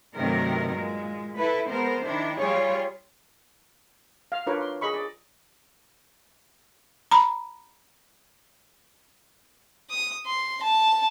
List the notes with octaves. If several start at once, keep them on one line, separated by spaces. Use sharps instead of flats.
G2 C3 D#3 F#3 A3 A#4
A#2 G#3
E4 A4 B4
G#3 B3 A#4 C5
D#3 D4 E4
G3 F4 G#4 C#5
F5
D4 F4 A#4 B4 C#5
C6
G#4 D#5 B5 C#6
D5
A#5 B5
D#6
C6
A5